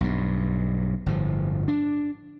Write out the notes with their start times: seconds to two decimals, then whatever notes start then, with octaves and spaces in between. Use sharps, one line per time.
0.01 B1 G2
1.06 G1 A2 F3
1.68 D4